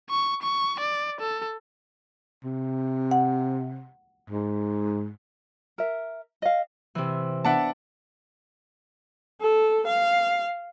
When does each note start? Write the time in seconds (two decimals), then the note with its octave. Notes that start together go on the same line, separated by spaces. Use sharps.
0.10 C#6
0.42 C#6
0.80 D5
1.21 A4
2.44 C3
3.11 F#5
4.30 G#2
5.78 A#4 E5
6.42 D#5 F5
6.95 C3 E3
7.45 B3 D4 D5 E5 F#5 A5
9.41 A4
9.87 F5